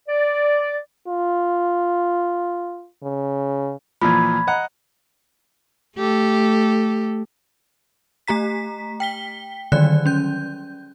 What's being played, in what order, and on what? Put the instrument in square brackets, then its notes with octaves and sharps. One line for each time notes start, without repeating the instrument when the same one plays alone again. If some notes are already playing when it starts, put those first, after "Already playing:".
[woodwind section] D5
[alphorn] F4
C#3
[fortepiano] A#2 E3 F3 [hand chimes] B5 G#6
[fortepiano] D#5 F#5 A#5
[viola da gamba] A3 G4 A4
[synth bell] A3 G4 A#5 B6
G5 B6 G7
D3 D#3 F#3 G3 D5 F#6
C#4 G6